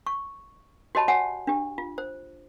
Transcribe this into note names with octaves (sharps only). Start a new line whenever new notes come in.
C#6
F#4 G4 C#5 D#5 A5 B5
F#4 C#5 F#5 G#5
D4 G4
F4
C5